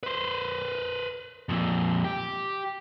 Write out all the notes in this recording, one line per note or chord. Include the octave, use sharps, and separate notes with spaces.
B4 C5
F2 A#2
G4